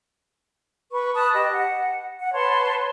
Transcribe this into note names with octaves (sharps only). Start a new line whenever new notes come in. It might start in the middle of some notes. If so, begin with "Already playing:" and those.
B4 C#6
B4 A5 D#6 F#6
G4 D#5
F#5
F#5
B4 C#5 A5 C6